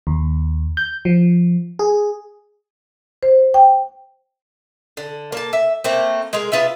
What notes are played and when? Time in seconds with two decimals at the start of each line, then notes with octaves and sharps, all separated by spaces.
0.07 D#2
0.77 G6
1.05 F3
1.79 G#4
3.23 C5
3.54 G5
4.97 D3
5.32 A#3 A5
5.53 E5
5.84 A3 A#3 C4
6.33 G#3 G#4 A#4
6.52 B3 F4 G#4 E5